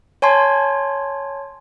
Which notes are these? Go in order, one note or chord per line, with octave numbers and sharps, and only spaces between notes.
C#5 G#5 A5 C6 G#6